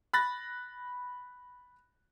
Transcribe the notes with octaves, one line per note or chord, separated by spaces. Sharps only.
B5 F#6 A6 A#6